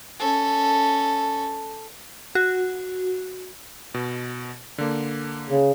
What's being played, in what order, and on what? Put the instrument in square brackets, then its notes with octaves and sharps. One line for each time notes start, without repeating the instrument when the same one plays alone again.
[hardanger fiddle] C#4 A4
[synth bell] F#4
[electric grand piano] B2
D3 A#3
[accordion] C#3